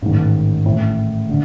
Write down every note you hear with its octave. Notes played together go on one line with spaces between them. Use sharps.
A1 G#2 D#3
A1 A2 E3
D3